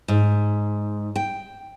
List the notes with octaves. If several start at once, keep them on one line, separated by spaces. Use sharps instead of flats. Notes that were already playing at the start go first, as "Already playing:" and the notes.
G#2
G5